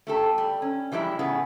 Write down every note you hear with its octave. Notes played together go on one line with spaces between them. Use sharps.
A3 G4 A4
G3
C#4
E3 F3 G3 G#3 E4
A2 C#3 B3 G#4